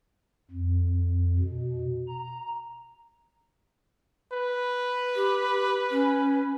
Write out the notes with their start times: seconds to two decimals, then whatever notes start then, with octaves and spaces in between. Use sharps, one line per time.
0.51 F2
1.39 B2
2.08 A#5
4.32 B4
5.15 G4
5.91 C#4